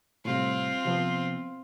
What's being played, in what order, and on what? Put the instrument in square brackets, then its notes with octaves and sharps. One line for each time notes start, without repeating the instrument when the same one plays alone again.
[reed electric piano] A2 C3 G3 [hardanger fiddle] C4 F4
[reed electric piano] C3 F3 B3